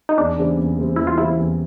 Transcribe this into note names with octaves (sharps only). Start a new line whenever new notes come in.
D#4
E2 D4
C#3 E3 G3 C4
E2
C#3 E3 G3 C4
E2 E4
F4
C#3 E3 G3 C4 E4
E2